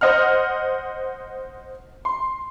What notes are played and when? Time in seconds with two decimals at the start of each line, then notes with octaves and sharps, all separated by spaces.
0.01 C5 D#5 F#5 F6
2.05 C6